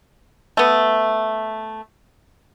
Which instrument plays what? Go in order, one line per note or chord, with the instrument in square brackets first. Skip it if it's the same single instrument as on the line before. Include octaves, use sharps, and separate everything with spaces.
[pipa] A3 B3